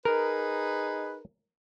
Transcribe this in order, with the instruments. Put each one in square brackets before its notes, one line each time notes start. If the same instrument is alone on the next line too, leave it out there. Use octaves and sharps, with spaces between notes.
[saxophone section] D#4 G#4 B4 [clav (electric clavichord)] A#4